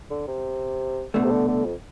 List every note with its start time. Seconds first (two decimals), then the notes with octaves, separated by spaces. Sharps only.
0.10 D3
0.27 C3
1.14 C2 B2 D3 A3
1.25 C3
1.31 D3
1.48 D3
1.65 F2